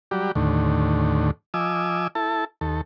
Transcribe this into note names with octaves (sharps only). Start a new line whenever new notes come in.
F#3 G3 G4 D5
D#2 A2 D3
F3 D#5 G#5 D6 E6
E4 A4 A5
D#2 A4